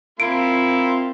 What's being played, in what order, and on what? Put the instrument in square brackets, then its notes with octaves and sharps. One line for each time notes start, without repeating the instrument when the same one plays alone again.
[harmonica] A#3 F4 C6 [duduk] C4 [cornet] E4 [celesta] D7